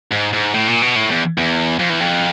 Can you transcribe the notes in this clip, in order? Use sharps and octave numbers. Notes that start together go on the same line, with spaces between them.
G#2
G#2
A2
A#2
B2
A2
E2
E2
F2
E2
F2